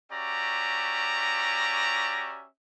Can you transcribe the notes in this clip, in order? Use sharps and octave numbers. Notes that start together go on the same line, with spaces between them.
C#4 F#4 G4 D5 E5 A#5